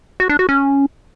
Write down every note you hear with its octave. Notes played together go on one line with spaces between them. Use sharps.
F#4
D4
F#4
C#4